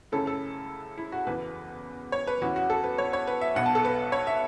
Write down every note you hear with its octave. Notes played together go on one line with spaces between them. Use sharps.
F#2 C#3 A3 C#4 E4 A4
A4
E4
F#4
F#1 E2 E3 B4
C#5
B4
E2 E3 C#4 E4 F#4
F#4
A4
B4
C#5
C#5
B4
E5
B1 B2 B3 F#5
A5
A4
B4
C#5
E5